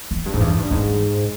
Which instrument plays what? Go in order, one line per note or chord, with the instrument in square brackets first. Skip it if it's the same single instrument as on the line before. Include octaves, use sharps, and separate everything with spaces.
[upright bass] E2
[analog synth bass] G2
[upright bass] F2 [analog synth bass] G#2
[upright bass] E2 [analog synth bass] G2
[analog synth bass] G2
[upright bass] E2 [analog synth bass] G#2